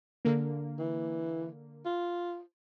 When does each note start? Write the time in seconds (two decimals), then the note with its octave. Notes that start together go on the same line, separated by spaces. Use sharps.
0.25 D3 A#3
0.79 E3
1.86 F4